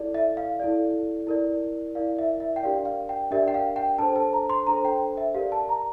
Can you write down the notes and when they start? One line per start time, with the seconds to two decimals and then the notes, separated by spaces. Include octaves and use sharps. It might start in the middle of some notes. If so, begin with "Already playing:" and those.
Already playing: E4 A4 D5
0.14 E5
0.37 F5
0.60 E4 A4 D5
1.27 E4 A#4 D5
1.95 E4 A#4 D5 F5
2.19 E5
2.40 E5
2.56 G5
2.63 D4 G4 A#4 D5 F5
2.85 F5
3.09 G5
3.31 D4 G4 A#4 D5 E5
3.48 G5
3.54 F5
3.76 G5
3.99 D4 A4 C5 A5
4.16 A5
4.33 A#5
4.49 C6
4.67 D4 A4 C5 A#5
4.85 G5
5.17 E5
5.34 G4 A#4 D5 F5
5.52 A5
5.69 A#5